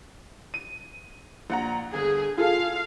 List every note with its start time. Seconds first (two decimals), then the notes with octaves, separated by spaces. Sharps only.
0.54 D#7
1.50 A#1 F#5 A#5
1.94 G1 G#4
2.38 F4 G#4 A4 F5